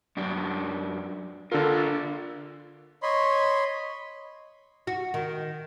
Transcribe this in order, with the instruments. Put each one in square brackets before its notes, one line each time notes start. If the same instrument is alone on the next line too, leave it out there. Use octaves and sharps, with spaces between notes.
[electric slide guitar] F#2 D4
[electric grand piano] D3 A4 A#4 [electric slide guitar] D4 F4
[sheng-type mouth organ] C#5 D#5 B5 C6
[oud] F#4
D#3